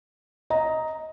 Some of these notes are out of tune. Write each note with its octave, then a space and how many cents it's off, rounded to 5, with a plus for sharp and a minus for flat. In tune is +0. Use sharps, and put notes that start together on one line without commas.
D#5 +15 A#5 +0